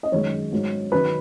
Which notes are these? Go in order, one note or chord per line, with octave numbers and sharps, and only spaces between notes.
D#5
F#2 D#3 G#3 C#4 C#5
G#2 F#3 C#4
D#3 F#3 B4